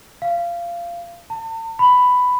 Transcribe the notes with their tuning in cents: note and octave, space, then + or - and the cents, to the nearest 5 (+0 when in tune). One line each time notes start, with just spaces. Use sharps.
F5 -20
A5 +45
B5 +10